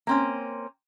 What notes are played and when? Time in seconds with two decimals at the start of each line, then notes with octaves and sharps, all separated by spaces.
0.07 A#3 C4 C#4